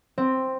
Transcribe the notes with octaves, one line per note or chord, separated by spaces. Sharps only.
C4